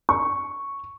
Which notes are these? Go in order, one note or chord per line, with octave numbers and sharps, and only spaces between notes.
C#6